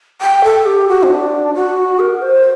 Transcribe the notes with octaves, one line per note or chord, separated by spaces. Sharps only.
G5
A4
G4
F#4
C4
D4
F#4
A#4
C5